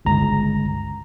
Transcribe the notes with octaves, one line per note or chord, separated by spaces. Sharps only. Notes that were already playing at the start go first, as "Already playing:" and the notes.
G1 C#2 A#5